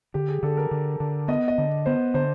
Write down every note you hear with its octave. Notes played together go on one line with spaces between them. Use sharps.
D3 G4
G#4
D3 A4
A#4
D3
D3
B3 D#5
D#5
D3
B3 C5
D3 C5